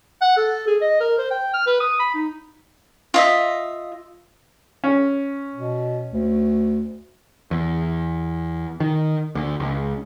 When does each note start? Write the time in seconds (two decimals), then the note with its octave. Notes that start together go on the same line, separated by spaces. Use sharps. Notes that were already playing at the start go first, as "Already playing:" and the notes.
0.21 F#5
0.37 A4
0.67 G#4
0.82 D#5
1.01 A#4
1.18 C5
1.31 G5
1.54 F6
1.67 B4
1.80 D#6
2.00 B5
2.15 D#4
3.14 F4 D#5 E5
4.84 C#4
5.54 B2
6.12 D2
7.51 E2
8.80 D#3
9.35 D2
9.60 C#2